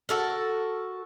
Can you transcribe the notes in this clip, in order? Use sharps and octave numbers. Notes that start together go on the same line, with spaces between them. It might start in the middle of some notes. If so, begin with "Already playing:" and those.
F#4 A4 A#4